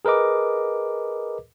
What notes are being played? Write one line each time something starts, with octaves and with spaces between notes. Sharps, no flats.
G#4 A#4 B4 D#5 D6